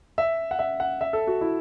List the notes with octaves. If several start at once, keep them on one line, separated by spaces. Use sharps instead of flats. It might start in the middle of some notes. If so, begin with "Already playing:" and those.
E5
F#5
E5
F#5
E5
A4
F#4
E4